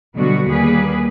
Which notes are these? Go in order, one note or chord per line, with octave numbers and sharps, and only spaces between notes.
B2 D3 F#3 G3 B3 F#4
D#2 G3 A#3 G#4 B4